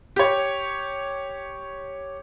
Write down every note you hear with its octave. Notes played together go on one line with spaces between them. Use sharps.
G4 C#5